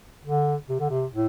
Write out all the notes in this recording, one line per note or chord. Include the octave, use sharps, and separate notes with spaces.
D3
C3
D3
C3
A2